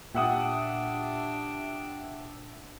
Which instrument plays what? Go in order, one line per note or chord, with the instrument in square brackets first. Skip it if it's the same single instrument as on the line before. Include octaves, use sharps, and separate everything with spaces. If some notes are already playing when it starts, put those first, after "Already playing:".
[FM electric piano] A#2 E5 E6 [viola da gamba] D4 [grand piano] G4 F#5 D#6